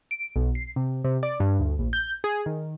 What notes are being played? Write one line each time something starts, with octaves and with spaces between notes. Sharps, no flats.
D7
B1
C7
C3
C3
D5
G2
D2
A#1
G6
G#4
D#3